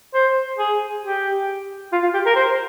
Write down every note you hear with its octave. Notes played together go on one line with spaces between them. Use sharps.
C5
G#4
G4
F4
F4
G4
A#4
C5